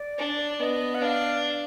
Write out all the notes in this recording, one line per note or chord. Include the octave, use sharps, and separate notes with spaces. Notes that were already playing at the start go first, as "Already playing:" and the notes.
Already playing: D5
D4
B3 D#5
F#5
D4 F5